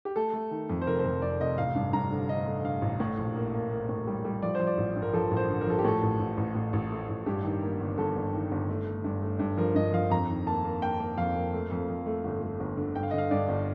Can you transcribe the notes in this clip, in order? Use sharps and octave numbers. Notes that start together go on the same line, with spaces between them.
G4
A3 A4
A3
D#3
F2
C5
F1 A#4
C5
F2 A#4
F1 D5
F1 D#5
A1 F5
G2
G2 A#5
D3
D3 D#5
A3
D3 F5
A1
A2
A#1
A#3
A#3
A#3
A2
G3
G3
F3 D5
F3 C5
D5
A1
G2
A#4
F3 A4
A1
C5
D3
A#4
F3 A4
G4
A2 A4
A1
A1
A1
A2
A1
A3
A1
G2 G4
D#3
A#3
G1
G1 A4
G1
D#3
G1
A3
A3
G2
A3
G2
F3 A#4
G2 D#5
F3 F5
F2 A#5
D#3
A#3 A5
A#3
A#3 G5
A#3
F2 F5
A#3
A3
F2
F2
A3
G1
A3
G1
D3
G2 G5
F5
D3 D#5
F5
G2 D5
G1